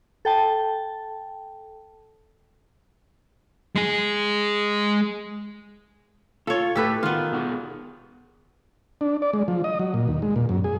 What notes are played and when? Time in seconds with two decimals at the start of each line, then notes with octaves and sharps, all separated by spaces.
0.25 A4 G5 A5
3.76 G#3 G#4
6.47 F4 A4 C#5
6.75 A2 G4 A4 B4
7.03 D#3 B3 F4
7.32 B2 G#4 F#5
9.01 D4
9.22 D5
9.33 G#3
9.48 F3
9.64 D#5
9.79 F#3
9.94 A#2
10.08 D#2
10.22 G#3
10.36 A#2
10.49 F#2
10.64 G#4